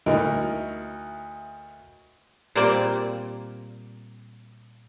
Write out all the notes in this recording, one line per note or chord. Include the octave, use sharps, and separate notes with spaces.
D2 D#4 E4 A#4 D#5
A#2 G3 A#3 C4 D5